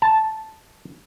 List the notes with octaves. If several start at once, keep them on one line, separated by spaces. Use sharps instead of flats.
A5